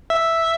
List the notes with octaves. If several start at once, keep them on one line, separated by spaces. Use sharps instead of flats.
E5